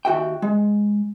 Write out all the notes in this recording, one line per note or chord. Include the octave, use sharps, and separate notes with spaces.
D#2 F#4 E5 G5
G#3